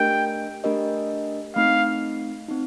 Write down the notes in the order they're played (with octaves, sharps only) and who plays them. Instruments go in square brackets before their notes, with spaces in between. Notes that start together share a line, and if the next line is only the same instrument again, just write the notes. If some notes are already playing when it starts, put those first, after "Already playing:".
Already playing: [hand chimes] A3 D4 G4 A#4 D#5 [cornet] G5
[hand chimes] A3 D4 G4 A#4 D#5
[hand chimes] A3 C4 D#4 [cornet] F5
[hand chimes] C4 D#4